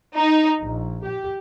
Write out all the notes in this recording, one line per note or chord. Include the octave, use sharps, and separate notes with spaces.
D#4
A#1
G4